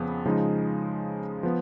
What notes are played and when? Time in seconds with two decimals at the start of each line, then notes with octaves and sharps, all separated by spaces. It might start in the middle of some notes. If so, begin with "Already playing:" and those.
Already playing: F2 C#3 F3 B3
0.25 C#3 F3 G#3 D#4
1.43 F3 B3